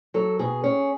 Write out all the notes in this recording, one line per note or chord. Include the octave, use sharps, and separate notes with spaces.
F#3 A4
B2 G#4
C#4 G#4